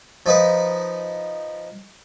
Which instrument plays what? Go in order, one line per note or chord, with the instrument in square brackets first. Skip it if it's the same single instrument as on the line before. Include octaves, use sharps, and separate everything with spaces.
[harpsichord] F3 D#4 B4